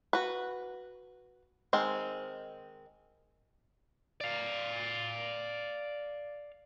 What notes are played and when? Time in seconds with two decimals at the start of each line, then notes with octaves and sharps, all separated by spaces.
0.13 F#4 B4
1.73 D#3 G#3 C4
4.21 D5 F5